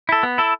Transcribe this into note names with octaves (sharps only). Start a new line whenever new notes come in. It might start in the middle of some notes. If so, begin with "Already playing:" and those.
E4 A4
B3
E4 A4